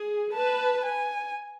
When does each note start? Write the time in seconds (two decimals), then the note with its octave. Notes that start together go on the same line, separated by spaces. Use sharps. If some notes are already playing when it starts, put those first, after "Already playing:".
Already playing: G#4
0.34 B4 A5
0.85 G#5